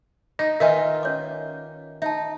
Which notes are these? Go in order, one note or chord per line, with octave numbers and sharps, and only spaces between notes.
D#4 D#5
D#3 D#4 F4 A#4 B4 D#5 E5 G#5
C#4 C#5 D6
D#4 E5 A5